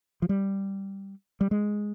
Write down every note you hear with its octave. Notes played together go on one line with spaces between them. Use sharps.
F3
G3
G3
G#3